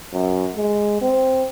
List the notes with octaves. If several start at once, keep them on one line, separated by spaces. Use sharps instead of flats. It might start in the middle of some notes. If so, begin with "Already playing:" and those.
F#2
G#3
C4